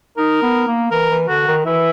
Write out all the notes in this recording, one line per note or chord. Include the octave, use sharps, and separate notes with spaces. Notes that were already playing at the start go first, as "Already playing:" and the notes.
D#4 A#4
B3
A#3
E3 A#4
E3
D3 F#4
D#3
E3 E4